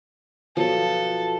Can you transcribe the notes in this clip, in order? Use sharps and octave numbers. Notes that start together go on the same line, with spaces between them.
B2 F3 F#3 A4